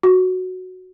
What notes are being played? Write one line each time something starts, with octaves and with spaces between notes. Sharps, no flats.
F#4